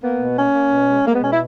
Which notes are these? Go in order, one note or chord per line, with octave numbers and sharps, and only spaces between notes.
A#3 B3
B2
A#3 C#4
A#3
B2
G#3
G#3 A#3
B3
B2 C#4
E4